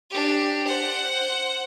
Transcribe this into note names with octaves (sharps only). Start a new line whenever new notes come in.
D4 G4
C5 F#5